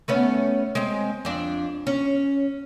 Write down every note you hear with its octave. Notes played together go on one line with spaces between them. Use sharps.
A3 B3 C#4
G#3 C4
F2 D4
C#4